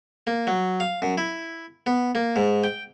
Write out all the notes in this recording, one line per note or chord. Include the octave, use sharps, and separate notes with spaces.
A#3
F#3
F5
F#2
E4
B3
A#3
G#2
G5